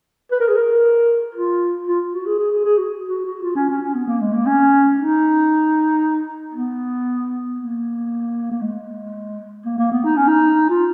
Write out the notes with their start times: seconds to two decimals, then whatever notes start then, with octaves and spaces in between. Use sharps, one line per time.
0.32 B4
0.40 A#4
0.48 G#4
0.56 A#4
1.35 F4
1.87 F4
2.13 F#4
2.26 G#4
2.39 G#4
2.52 G#4
2.64 G#4
2.78 F#4
3.08 F#4
3.25 F#4
3.43 F4
3.56 C#4
3.69 C#4
3.82 C#4
3.94 B3
4.08 A#3
4.21 G#3
4.33 A#3
4.46 C#4
4.99 D#4
6.54 B3
7.58 A#3
8.52 A#3
8.62 G#3
9.65 A#3
9.78 A#3
9.92 B3
10.04 D#4
10.17 C#4
10.28 D#4
10.69 F4